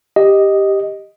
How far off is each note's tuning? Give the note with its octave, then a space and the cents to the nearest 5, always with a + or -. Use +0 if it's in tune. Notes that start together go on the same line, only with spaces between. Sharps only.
G4 +0 D#5 +0